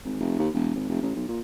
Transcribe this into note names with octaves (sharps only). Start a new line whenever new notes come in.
G#1
F1
D#2
E1
G#1
F1
A1
B1
A#2